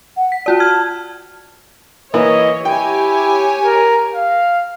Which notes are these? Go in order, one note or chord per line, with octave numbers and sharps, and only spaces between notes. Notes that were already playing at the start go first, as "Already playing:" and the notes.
F#5
B6
F4 F#4 D5 A5
F6 G#6
E3 A#3 E4 C#5 D#5
E4 G4 C#5 G5 G#5
A#4
F5